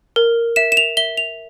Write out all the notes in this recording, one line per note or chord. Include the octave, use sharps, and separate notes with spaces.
A#4
E5 E7
E7
F7
E5 G7
F7